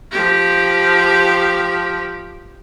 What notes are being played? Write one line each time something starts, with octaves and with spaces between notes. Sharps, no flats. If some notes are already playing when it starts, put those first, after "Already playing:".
F3 G4